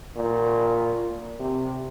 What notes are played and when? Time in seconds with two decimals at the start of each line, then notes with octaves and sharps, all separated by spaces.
0.17 A#2
1.40 C3